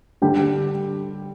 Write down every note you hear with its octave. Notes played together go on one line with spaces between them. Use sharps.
D3 G3 D4 G4